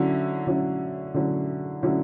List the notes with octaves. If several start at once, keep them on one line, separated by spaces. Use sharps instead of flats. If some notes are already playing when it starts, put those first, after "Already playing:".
Already playing: D3 F#3 C#4 E4
D3 F#3 C#4 E4
D3 F#3 C#4 E4
D3 F#3 C#4 E4